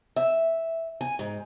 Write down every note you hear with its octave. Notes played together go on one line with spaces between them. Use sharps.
E5
G#5
G#2